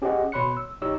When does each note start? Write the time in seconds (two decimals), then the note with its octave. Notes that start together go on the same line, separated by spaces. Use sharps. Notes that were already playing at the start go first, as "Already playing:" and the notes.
0.02 C#4 G4 G#4 C#5 D#5 F#5
0.32 B2 C#5 B5 C6 F#6 C#7
0.57 E6
0.82 B1 D#4 G4 C#5 E6